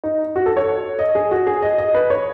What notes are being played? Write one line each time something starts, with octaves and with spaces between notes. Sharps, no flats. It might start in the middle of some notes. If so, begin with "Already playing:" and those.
D#4
F#4
A4
C#5
D#5
G#4
F#4
G#4
D#5
D#5
B4
C#5